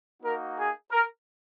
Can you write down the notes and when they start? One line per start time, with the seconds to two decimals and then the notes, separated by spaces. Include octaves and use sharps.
0.22 A#3 D#4 F#4 A#4
0.57 G#4
0.91 A#4